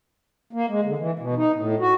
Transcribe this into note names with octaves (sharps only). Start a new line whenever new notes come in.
A#3
G#3
D3
E3
B2
D#4
A2
F#4